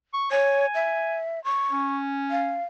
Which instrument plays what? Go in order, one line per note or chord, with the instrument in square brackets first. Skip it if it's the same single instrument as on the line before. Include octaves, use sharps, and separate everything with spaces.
[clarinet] C#6
[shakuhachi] C#5 [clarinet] G#5
[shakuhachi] E5
C#6
[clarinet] C#4
[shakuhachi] F5